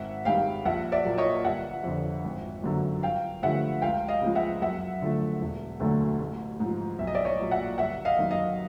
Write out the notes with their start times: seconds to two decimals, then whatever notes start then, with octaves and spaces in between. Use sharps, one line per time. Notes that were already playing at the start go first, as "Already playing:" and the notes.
Already playing: G#1 E5 F#5
0.25 G2 D#3 G#3 F5 G5
0.65 A#1 E5 F#5
0.92 D5 E5
1.05 A#2 F#3 A#3
1.18 C#5 D#5
1.45 G1 E5 F#5
1.84 F2 D3
2.24 G#1
2.64 F#2 D3 F#3
3.03 G1 F5 G5
3.42 G2 D3 F3 A3 E5 F#5
3.82 C#2 F5 G5
4.08 D#5 F5
4.22 C#3 F3 G#3
4.35 E5 F#5
4.62 F#2 E5 F#5
5.02 D3 F3 A3
5.41 E1
5.80 D2 D3 F#3 A3
6.20 A1
6.60 G#2 F3
6.99 B1 E5
7.07 D#5
7.15 D5 E5
7.25 C#5 D#5
7.39 A#2 F#3
7.51 E5 F#5
7.78 G1 E5 F#5
8.05 D#5 F5
8.19 F#2 D#3
8.31 D#5 F5